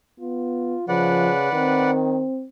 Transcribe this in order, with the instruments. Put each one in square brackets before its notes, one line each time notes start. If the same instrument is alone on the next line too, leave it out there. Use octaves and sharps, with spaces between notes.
[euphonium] B3 [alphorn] F4
[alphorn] C#3 [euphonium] F3 [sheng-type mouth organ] B4 D5 F#5
[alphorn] D#3 [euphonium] C4